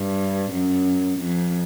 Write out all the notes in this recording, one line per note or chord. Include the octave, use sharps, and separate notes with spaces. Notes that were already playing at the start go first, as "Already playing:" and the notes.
Already playing: G2
F#2
F2